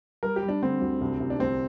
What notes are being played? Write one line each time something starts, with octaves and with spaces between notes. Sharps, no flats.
G3 A#4
G4
G3
D4
D3 C4
D2
C2
C2
D4
C2 C4